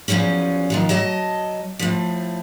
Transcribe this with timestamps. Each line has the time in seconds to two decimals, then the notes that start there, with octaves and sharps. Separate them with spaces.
0.08 E2 A2 F3 F#3 C#4
0.70 D#3 F3 F#3
0.89 F#3 D#5 A5
1.79 A2 F3